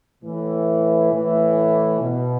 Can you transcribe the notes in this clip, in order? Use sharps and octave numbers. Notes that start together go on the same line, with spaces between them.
A2 E3
A2 E3
B2